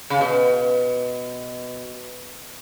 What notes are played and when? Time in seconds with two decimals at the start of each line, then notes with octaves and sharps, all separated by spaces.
0.10 C#3
0.21 B2